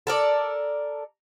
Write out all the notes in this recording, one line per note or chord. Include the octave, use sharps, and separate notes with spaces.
A4 A#4 D5